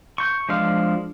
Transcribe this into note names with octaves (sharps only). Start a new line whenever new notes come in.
C#6 G6
F3 G#3 D4 F5